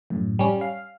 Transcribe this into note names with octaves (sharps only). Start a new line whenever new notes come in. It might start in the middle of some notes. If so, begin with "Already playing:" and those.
F#2 A2
G3 C#4
F5